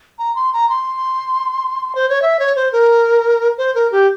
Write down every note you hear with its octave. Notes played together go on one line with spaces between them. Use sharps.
A#5
C6
A#5
C6
C5
C#5
E5
C#5
C5
A#4
C5
A#4
G4